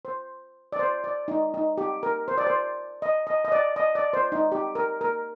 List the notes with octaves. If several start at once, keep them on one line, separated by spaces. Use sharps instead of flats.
C5
D5
C5
D5
D#4
D#4
G4
A#4
C5
D5
C5
D#5
D#5
D#5
D5
D#5
D5
C5
D#4
G4
A#4
A#4